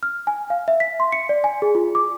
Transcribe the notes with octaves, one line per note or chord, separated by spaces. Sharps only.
F6
G#5
F5
E5
B6
C6
C#7
D5
G#5
G#4
F4
D6